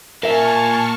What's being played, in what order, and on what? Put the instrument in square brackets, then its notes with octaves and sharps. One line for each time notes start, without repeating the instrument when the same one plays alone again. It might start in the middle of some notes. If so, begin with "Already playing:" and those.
[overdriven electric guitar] A#2 F5 [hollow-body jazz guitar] A#4 E5 [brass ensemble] G#5 [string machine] A5 C#6 F6